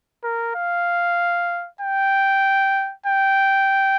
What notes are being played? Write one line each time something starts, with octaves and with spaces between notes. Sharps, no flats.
A#4
F5
G5
G5